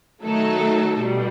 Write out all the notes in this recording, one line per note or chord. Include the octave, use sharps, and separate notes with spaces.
D#3 F#3 A3 D#4 A4
B2 G3